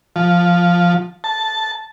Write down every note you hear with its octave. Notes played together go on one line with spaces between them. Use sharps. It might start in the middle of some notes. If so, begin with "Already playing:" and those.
F3
A5